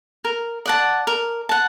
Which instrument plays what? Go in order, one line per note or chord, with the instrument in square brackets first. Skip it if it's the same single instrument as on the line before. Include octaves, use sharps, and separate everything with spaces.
[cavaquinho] A#4
D5 F#5 A5
A#4
F#5 A5